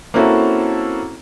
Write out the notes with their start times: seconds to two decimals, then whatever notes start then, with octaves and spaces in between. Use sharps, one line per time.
0.14 A#3 C4 C#4 E4 F#4 A4